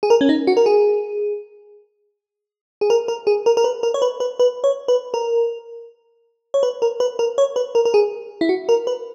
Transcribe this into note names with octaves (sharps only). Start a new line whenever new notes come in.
G#4
A#4
C#4
D#4
F#4
A#4
G#4
G#4
A#4
A#4
G#4
A#4
A#4
B4
A#4
C#5
B4
B4
B4
C#5
B4
A#4
C#5
B4
A#4
B4
A#4
C#5
B4
A#4
A#4
G#4
E4
F#4
A#4
B4